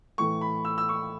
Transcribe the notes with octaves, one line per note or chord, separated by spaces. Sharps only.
A2 E3 A3 C#6
B5
E6
E6
C#6